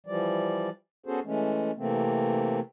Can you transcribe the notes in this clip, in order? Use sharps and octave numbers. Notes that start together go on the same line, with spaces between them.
E3 F3 G3 D5
B3 C#4 F#4 G#4 A4 C5
E3 G#3 A3 C#4
C3 E3 A3 A#3 C4